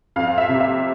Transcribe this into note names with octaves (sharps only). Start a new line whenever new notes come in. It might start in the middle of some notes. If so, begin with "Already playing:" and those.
F2 F5
F5
E5
C3
E5